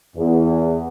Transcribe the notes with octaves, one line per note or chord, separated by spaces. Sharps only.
E2